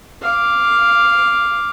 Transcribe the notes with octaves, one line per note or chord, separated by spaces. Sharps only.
F5 D6